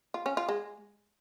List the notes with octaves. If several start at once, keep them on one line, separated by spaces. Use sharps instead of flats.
F4
C#4
F4
G#3